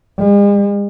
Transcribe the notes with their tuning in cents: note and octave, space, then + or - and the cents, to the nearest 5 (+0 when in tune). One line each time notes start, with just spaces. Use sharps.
G#3 -45